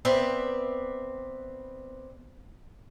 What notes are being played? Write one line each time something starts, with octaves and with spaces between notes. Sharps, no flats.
B3 C4 B4 D5 E5